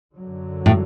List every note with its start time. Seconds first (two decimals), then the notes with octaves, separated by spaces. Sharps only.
0.16 F#2 D3 F#3
0.66 A2